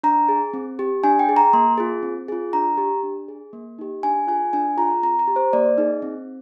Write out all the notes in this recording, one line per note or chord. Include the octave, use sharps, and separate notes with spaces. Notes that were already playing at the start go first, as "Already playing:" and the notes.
D4 A#5
G#4
C4
G4
D4 G#5
G5
G#4
A#5
A#3 C6
F4 G#4
C4
F4 G#4
D4 A#5
G4
D4
G#4
A#3
D#4 G4
D4 G#5
F4 G#4 G#5
D4 G#5
F4 G#4 A#5
C4 A#5
A#5
G4
C5
A#3 D5
D#4 G#4
C4